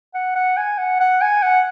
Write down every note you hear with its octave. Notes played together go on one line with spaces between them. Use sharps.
F#5
F#5
G#5
F#5
F#5
G#5
F#5